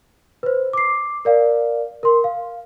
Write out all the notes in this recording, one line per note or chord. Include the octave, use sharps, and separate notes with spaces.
B4 C5
D6 C7
A#4 D5 F5
A#4 C6
F5